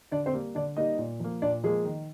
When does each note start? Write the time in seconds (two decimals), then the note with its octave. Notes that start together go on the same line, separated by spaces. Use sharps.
0.11 D3 D4 D5
0.26 C4 C5
0.34 G3 A#3
0.55 D3 D4 D5
0.77 G3 A#3 D#4 D#5
0.98 A#2
1.20 F3 A#3
1.42 A#2 D4 D5
1.64 F3 G#3 A#3 G#4
1.85 D#3